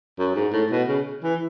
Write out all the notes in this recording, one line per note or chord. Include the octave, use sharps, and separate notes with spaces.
F#2
G#2
A2
B2
C#3
E3